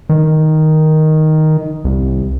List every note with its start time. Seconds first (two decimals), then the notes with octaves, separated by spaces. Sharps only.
0.09 D#3
1.85 C2